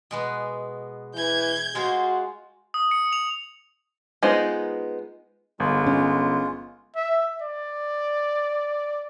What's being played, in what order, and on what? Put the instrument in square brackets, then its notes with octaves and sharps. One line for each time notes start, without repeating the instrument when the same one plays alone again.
[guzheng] B2 G#3 B3
[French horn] E3 [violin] G6 G#6
[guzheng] G#3 F4 C5 [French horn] F#4
[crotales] D#6
C#7
F7
[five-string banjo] G#3 B3 D#4 F4 C5
[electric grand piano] G1 [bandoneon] G#3 F4
[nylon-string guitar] C#4
[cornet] E5
D5